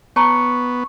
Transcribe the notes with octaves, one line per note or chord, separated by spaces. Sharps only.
B3 C#5 A5 A#5 C#6